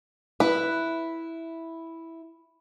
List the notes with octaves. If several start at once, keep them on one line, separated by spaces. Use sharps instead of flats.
E4 B4